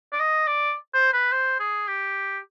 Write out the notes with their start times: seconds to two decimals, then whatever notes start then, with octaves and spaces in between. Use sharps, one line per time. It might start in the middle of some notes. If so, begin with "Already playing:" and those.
0.12 D5
0.19 D#5
0.47 D5
0.94 C5
1.13 B4
1.32 C5
1.60 G#4
1.87 G4